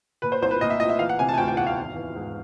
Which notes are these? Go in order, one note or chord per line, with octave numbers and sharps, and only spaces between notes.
A#2 B4
C5
C2 C5
B4
A#2 D#5
E5
C2 D#5
E5
E3 F5
F#5
C3 G#5
A5
G#5
D2 G5
G5
E1 F#5
F5
G#1
E3
G#2